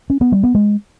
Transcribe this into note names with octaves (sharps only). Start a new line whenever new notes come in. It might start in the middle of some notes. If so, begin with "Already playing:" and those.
C#4
B3
G3
B3
G#3